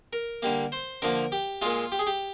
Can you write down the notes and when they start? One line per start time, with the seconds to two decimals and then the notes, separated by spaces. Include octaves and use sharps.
0.13 A#4
0.42 D3 G3 A#3
0.72 C5
1.02 D3 F3 A#3 A#4
1.32 G4
1.61 A#2 G#3 F4
1.92 G4
1.99 G#4
2.07 G4